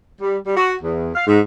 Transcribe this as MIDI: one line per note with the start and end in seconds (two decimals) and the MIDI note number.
0.20 0.36 55
0.45 0.56 55
0.57 0.73 66
0.82 1.11 40
1.14 1.27 77
1.27 1.39 44